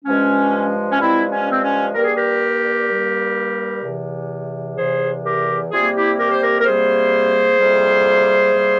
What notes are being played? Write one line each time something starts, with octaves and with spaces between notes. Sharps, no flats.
G2 F3 G#3 C#4
C#4
G2 F3 G#3 C4 E4
C#4
C4
C#4
G2 G3 A#3 A#4
G#4
G4 A#4
G2 G3 A#3
E2 C3 E3
E2 C3 E3 G#4 C5
G4 A#4
C3 G3 A#3 F4 G#4
E4 G4
G4 A#4
C5
G4 A#4
A#4
C3 G3 A#3 G#4 C5
F2 C3 G3 A#3
C3 G3 A#3